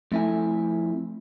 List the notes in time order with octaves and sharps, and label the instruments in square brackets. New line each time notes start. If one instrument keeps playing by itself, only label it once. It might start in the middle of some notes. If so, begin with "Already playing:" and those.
[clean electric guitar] F2 E4 G#5 [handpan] A3